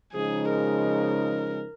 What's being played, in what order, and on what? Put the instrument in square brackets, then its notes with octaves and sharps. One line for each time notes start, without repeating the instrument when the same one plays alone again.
[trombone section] C#3 F3 G#3 D#4 [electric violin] G#4
[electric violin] A#4